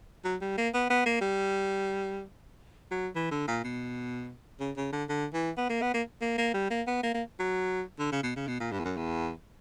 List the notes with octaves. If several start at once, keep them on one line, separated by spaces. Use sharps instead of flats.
F#3
G3
A#3
B3
B3
A#3
G3
F#3
E3
D3
A#2
B2
C#3
C#3
D3
D3
E3
B3
A#3
B3
A#3
A#3
A#3
G3
A#3
B3
A#3
A#3
F#3
D3
C#3
B2
C#3
B2
A#2
G2
E2
F#2
E2